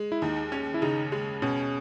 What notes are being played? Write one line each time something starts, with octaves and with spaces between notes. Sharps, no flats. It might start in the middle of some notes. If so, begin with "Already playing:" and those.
Already playing: G#3
E4
D#2 D#4
C#4
E4
C#3 D#4
G#3
B2 C#4